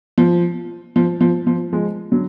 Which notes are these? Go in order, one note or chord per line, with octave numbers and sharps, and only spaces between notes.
F3
F3
F3
F3
F3 G#3
D3 F#3